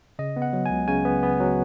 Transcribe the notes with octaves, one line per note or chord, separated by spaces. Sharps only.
C#3 D#5
B3
F#5
F#3
C#2 G#5
C#3 G#5
B3
B3
F#3